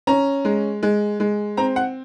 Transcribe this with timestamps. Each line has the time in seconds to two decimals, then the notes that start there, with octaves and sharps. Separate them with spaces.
0.07 C#4 A#5
0.45 G#3
0.83 G#3
1.20 G#3
1.57 C4 A#5
1.76 F#5